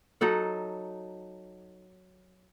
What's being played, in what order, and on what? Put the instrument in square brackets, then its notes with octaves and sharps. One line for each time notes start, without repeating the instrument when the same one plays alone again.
[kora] F#3 D#4 A4 F#5